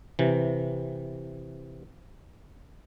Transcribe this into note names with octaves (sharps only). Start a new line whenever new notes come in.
C3 E3